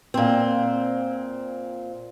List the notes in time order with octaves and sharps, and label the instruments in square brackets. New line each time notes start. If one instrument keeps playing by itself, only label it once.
[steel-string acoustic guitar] A#2 C4